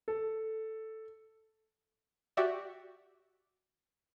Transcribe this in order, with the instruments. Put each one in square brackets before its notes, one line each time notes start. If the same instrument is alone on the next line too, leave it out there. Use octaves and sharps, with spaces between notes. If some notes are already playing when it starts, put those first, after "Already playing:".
[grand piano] A4
[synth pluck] F#4 G4 D5 E5